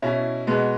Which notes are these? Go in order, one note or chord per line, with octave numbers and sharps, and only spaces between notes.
B2 C#4 E4
B2 G#3 B3